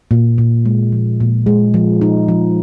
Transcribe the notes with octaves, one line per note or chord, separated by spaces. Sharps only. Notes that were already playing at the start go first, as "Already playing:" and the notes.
A#2
A#2
G#3
F3
A#2
G#3
F3
D#4
F3